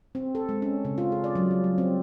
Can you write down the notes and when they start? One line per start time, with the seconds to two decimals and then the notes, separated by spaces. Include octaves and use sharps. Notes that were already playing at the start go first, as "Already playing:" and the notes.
0.15 C4
0.35 A4
0.49 G#3
0.62 C#4
0.85 C#3
0.98 F4
1.12 G#4
1.24 D5
1.35 F#3
1.51 G3
1.64 F#3
1.78 C4